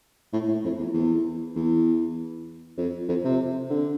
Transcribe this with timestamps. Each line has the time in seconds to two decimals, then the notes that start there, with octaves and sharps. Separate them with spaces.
0.33 A2
0.48 A2
0.64 F2
0.79 E2
0.94 E2
1.56 E2
2.77 F2
3.09 F2
3.25 C3
3.70 D3